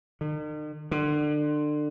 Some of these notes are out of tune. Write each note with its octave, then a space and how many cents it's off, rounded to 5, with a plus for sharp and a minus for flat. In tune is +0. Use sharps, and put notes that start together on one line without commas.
D#3 -45
D3 +30